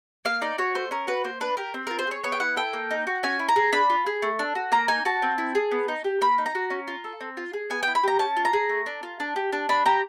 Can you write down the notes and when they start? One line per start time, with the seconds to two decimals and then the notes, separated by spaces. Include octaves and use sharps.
0.25 A#3 F5
0.41 D#4 D5
0.58 F#4 C#5
0.75 A3 C5
0.91 C#4 A#4
1.07 F#4 B4
1.24 A#3 C5
1.41 D4 B4
1.57 G4 A#4
1.74 C4
1.87 F4 A#4
1.99 C5
2.07 G#4 C#5
2.23 B3 C#5
2.32 G5
2.40 E4 F#5
2.56 A4 G5
2.73 A#3
2.91 D#4
3.07 F#4
3.23 C#4 G#5
3.39 E4
3.49 A#5
3.56 G#4
3.72 D4 B5
3.90 F4
4.06 G#4
4.22 A3
4.39 D4
4.55 F#4
4.72 A#3 A#5
4.88 D#4 G#5
5.05 F#4 A5
5.22 C4
5.38 E4
5.55 G#4
5.71 B3
5.88 D#4
6.04 G4
6.21 A#3 B5
6.38 D#4
6.46 A#5
6.55 F#4
6.70 C#4
6.88 F4
7.04 A4
7.21 C4
7.37 F4
7.53 G#4
7.70 B3 G#5
7.83 E4 G5
7.95 B5
8.03 G4 A#5
8.19 C#4 A5
8.37 F4
8.45 A#5
8.53 G#4
8.69 A3
8.86 D4
9.03 F4
9.20 D4
9.36 G4
9.52 D4
9.69 D4 B5
9.86 G4 A#5